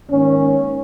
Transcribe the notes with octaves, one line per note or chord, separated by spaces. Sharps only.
G#2 D#3 A#3 C#4